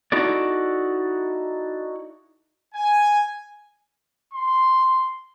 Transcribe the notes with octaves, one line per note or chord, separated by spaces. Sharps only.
D#4 E4 F#4 A4 D5
G#5
C6